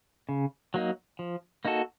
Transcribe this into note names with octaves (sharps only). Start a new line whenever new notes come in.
C#3
F#3 A#3 D#4
F3
A#3 D#4 F#4 A4